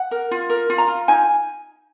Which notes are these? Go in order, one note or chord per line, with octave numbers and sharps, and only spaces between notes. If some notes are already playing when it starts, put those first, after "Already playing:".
Already playing: F#5
A#4
F4
A#4
F4
A#5
F4
D#4 G#5